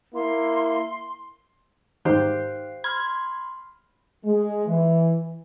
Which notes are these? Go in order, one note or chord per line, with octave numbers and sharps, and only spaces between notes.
A#3 E4 C6
G#2 D#3 G4 C5 F5 F#6
B5 C6 F6 G#6
G#3
E3